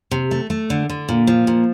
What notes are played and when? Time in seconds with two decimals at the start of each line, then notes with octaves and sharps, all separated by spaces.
0.11 C3
0.31 A3
0.50 A3
0.70 D3
0.89 D3
1.09 A#2
1.27 F3
1.47 A#2